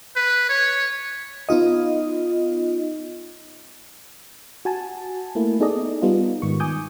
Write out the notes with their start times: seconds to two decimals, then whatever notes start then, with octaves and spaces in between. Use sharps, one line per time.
0.16 B4
0.49 C#5
1.49 B3 D#4 F4 D#5
4.65 F#4 G#5 A5
5.35 A3 A#3 E4
5.60 B3 D#4 G#4 A4 D5 D#5
6.02 G3 B3 D#4 F4
6.42 G#2 D#3 C#6
6.60 G#5 D6 D#6 G6